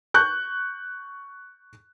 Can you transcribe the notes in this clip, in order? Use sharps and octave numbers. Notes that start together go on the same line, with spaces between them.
C#6 F#6 G6